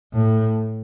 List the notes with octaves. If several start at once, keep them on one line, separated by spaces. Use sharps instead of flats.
A2